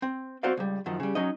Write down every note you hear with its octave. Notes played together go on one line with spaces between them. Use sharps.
C4
C4 F#4 C5 D5 F5
C#2 G3
F#2 D#3 F3
C#3 G3
F#3 C#4 D#4 D#5